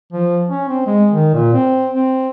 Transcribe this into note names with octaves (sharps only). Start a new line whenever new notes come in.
F3
C#4
C4
G#3
D#3
A#2
C4
C4